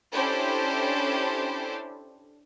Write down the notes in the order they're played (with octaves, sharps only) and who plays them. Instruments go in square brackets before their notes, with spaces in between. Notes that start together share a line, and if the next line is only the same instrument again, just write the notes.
[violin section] C#4 D4 E4 G4 A4 C5